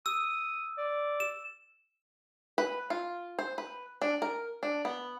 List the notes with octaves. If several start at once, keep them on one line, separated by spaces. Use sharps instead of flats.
D#6 E6
D5
E7
B4
F4
C5
B4
D4
A#4
D4
B3